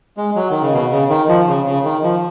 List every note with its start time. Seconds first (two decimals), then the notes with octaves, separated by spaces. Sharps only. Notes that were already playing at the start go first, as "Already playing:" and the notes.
0.17 G#3
0.36 F#3
0.50 D#3
0.62 C#3
0.73 B2
0.91 C#3
1.09 D#3
1.28 F3
1.48 C#3
1.66 C#3
1.84 D#3
2.03 F3